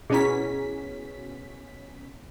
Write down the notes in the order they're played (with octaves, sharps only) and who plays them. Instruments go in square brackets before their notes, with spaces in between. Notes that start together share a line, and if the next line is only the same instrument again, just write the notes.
[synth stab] B2 C#4 B6 [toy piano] E4 G#4